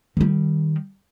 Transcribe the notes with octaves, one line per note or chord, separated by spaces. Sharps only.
D#3 G3